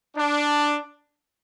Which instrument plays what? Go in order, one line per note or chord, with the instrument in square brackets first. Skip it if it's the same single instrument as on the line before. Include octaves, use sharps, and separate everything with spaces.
[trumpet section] D4